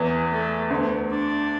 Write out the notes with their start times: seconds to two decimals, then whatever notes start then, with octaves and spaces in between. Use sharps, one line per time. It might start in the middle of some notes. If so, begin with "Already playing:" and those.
Already playing: E2 E3
0.31 A3
0.70 D2 D3 B3
1.10 D4